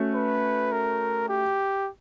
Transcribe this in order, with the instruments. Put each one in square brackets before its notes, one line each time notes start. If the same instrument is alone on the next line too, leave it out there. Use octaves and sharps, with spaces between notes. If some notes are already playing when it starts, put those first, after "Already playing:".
Already playing: [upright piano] A3 C#4 F#4
[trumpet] B4
A#4
G4